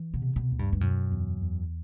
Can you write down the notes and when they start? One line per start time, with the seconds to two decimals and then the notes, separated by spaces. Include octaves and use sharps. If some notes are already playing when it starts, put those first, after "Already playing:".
Already playing: E3
0.14 B2
0.22 C3
0.36 B2
0.51 D2
0.59 G2
0.73 G2
0.81 F#2 B2
1.11 E2
1.41 E2